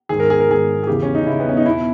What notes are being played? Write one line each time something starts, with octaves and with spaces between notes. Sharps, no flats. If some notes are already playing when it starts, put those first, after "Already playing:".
G#2 D#3 G#4
A#4
G#4
A#4
G#2 D#3 G#4
G#4
E2 C#3 E3 G4
C#4
D#4
E2 C#3 E3 E4
B3
C#4
D#4
E2 B2 E4